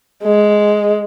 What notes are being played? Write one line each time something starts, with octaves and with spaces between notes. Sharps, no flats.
G#3